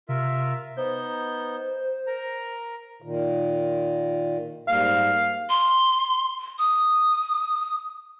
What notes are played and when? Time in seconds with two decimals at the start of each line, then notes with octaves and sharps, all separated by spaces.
0.09 C3 F4 A#4 E5
0.77 B3 D#4 C5 G6
2.07 A#4 A#5
3.02 A#2 D#3
4.68 G#2 G3 A#3 F5
5.50 C6
6.59 D#6